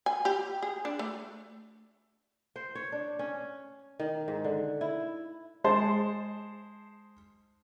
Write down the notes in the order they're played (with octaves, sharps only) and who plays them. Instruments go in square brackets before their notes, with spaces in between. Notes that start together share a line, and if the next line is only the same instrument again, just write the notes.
[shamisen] G#5
G4
G#4
D4
A3
[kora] C5
C#5
D4
C#4
D#3
G#2
D3
E4
[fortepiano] G#3 C5 A5